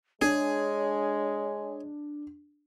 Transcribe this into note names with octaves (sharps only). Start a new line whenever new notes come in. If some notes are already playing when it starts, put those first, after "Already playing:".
G#3 D4 G#4 C#5